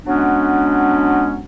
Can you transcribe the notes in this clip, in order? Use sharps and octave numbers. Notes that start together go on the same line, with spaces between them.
F#3 G#3 B3 C#4 D4